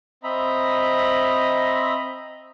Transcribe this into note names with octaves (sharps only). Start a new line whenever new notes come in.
C4 D#5 E5 A#5 B5